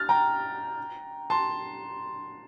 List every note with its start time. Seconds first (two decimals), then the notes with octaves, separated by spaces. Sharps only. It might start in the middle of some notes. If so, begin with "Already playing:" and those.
Already playing: F6 A6
0.09 G5 A#5
1.30 A5 C6